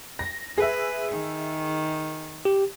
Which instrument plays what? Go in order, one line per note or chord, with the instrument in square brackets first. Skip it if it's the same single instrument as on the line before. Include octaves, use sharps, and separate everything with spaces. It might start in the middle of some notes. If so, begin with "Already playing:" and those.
[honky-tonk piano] A#6
[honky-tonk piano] G#4 E5 [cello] B4
[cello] D#3
[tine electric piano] G4